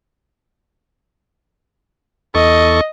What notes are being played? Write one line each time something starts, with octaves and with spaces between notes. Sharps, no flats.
E2 A4 D#5 C#6